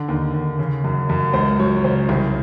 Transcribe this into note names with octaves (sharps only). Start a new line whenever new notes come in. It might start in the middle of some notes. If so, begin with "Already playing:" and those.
Already playing: D3
D#2
D#2
C#3
F#2
F#2
C#2 C5
F#3 C#5
C#3 C5
C2